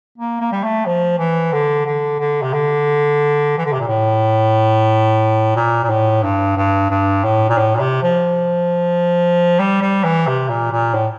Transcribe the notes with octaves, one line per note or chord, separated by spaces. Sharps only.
A#3
A#3
G3
A3
F3
E3
D3
D3
D3
C3
D3
E3
D3
C3
A#2
A2
A#2
A#2
A2
G2
G2
G2
A2
A#2
A2
A#2
C3
F3
G3
G3
E3
C3
A#2
A#2
A2